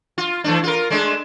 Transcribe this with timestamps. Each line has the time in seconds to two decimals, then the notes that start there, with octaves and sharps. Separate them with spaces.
0.18 F4
0.44 E3 A3 D4
0.63 F4 A#4
0.90 G#3 A3 D4